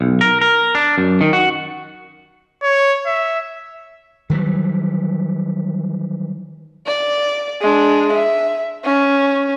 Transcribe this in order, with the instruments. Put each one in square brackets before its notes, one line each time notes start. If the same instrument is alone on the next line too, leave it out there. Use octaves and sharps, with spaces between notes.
[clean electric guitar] B1
A#4
A#4
D4
F#2
D#3
F#4
[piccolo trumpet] C#5
E5
[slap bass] D#3 E3 F#3 G3
[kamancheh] D5
G#3 D4
E5
C#4